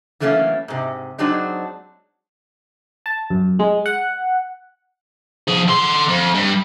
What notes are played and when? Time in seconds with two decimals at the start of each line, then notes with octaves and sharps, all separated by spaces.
0.20 E3 F#3 A3 A#3 C4 C#4
0.68 G#2 C3
1.18 F#3 G#3 C4 D4 D#4
3.06 A5
3.30 F#2
3.59 G#3
3.86 F#5
5.48 F3 G#4
5.68 D3 C6
6.08 F2
6.34 G2